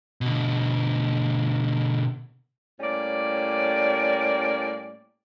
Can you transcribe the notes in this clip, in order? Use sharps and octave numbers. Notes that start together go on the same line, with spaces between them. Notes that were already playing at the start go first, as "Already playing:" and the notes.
B2 D3
A2 G3 A#3 C#4 D5